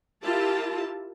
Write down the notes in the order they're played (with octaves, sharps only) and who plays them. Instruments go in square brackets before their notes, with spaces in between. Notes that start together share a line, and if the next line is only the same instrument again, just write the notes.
[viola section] E4 F4 G4 A#4 A5